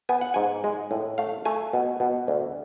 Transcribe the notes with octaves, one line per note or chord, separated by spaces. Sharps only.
B3 G#5
F#5
G#2 G#5
G#3
A2
A3 F5
A3 G#5
B2
B2
D2